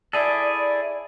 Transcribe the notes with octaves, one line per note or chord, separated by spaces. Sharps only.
E4 G#4 A4 D5